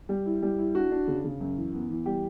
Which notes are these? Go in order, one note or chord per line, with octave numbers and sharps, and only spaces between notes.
G3
E4
G3
E4
D4 F#4
D4
C#3
C#3
F#2
E3
B3
E3
G3 G4